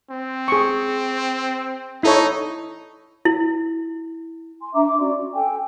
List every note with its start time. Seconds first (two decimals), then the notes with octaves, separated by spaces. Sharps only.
0.10 C4
0.48 G#4 C#6
2.03 D#4 E4 A4 C#5
3.25 E4
4.60 G#5 C6
4.74 D4 E5 A#5 D6
4.85 C6 D6
4.99 C#4 F#4 D5
5.16 F#4
5.33 A4 G5 G#5